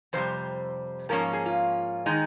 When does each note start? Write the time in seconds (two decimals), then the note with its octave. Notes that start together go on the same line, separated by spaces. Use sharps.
0.13 F2 C3 G3 C5
1.09 G#2 F3 A#3 C#4 A#4
1.33 G#4
1.46 F4
2.06 D#3 G#3 D#4